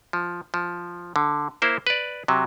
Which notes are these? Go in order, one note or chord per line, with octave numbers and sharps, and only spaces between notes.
F3
F3
D3
A#3 E4 C5
B4 D5
C3 F#3